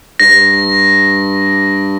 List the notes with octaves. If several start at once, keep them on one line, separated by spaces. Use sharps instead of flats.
G2 A#6